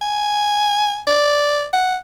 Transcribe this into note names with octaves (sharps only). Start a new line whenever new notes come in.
G#5
D5
F#5